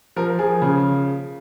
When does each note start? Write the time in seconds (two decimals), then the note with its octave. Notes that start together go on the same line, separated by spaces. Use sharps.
0.16 F3 A#4
0.39 F3 G#4
0.62 C#3